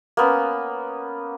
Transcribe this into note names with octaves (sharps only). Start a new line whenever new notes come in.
A#3 B3 C#4